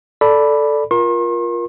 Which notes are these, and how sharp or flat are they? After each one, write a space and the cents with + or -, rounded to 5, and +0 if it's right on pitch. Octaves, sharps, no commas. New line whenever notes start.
A4 +0 D5 +0 B5 +0
F4 +0 A#4 +25 C6 +45